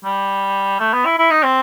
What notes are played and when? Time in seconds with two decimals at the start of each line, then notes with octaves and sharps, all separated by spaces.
0.05 G3
0.80 A3
0.93 B3
1.06 E4
1.18 E4
1.31 D#4
1.43 C4